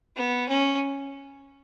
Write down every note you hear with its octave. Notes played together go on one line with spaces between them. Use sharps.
B3
C#4